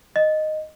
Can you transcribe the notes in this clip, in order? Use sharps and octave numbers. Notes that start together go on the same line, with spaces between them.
D#5